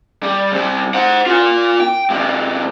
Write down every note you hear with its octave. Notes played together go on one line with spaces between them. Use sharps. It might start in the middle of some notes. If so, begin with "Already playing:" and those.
G3
C3 G3
C5 F#5
F4 A#4
G5
C3 G#3